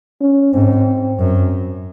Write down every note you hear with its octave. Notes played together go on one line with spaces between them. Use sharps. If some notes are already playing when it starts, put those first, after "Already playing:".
C#4
G#2 C4
F#2